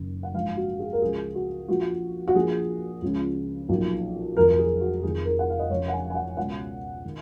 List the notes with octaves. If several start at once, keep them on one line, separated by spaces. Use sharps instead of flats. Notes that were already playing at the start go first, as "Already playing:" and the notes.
Already playing: F#1 F#2 D#3
F#5
A#1 G#2 F3 F5
F#4
G#4
A#4
C#2 C#3 F3 G#4
F#4
A#1 A#2 F3 F#4
F#4
A#1 A#2 F3 G#4
C#2 C#3 F3
B1 A#2 F3
F1 F2 D#3 A#4
A#4
G#4
F#4
F1 F2 D#3 G#4
A#4
F#5
F5
D#5
F1 F2 C#3 F3 C#5
F#5
G#5
G#5
F#5
C#2 B2 F#5
D#3